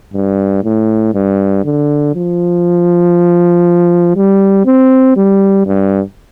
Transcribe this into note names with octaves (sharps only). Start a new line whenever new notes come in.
G2
A2
G2
D3
F3
G3
C4
G3
G2